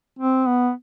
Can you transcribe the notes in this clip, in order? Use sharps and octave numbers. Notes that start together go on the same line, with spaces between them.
C4
B3